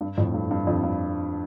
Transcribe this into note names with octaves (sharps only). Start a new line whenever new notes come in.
G2
F2 A2
G2
G2
F2
G2